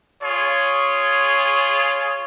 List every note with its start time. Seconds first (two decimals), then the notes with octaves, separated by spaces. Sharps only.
0.23 F4 G#4 C#5